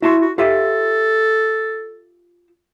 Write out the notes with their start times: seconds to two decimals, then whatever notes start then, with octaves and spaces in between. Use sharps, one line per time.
0.02 E4 F#4 A5 C6
0.22 F#4
0.38 F4 G4 A4 E5